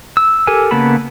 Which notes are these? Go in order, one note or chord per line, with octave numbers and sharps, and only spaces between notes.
E6
G4 A4 A#4 G#5
C#3 A#3 B3 A5 B5